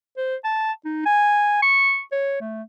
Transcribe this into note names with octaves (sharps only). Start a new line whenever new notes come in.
C5
A5
D#4
G#5
C#6
C#5
A3